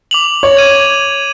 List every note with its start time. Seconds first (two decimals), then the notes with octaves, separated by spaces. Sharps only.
0.11 D6 F7 F#7
0.43 C#5
0.57 G#6 D#7